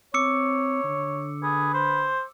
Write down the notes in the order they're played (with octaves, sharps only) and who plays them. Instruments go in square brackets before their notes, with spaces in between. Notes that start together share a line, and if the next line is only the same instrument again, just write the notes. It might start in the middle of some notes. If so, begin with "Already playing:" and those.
[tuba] C4 [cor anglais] C#5 [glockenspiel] D6 E6 C#7
[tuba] D3
[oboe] G#4 [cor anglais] B4
[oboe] C5